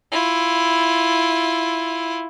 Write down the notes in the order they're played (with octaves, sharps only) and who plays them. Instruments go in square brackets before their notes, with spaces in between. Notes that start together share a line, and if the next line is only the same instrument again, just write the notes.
[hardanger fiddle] E4 F4